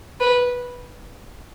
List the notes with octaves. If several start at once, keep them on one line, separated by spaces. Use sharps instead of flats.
B4